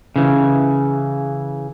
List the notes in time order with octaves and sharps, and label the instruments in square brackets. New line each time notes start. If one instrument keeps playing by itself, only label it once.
[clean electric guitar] C#3 E3